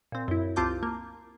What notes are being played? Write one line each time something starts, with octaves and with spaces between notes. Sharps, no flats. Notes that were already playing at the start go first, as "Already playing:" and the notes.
A#2 C4
F#2 E4
C2 C4 F4 A5 D6 G6
A#3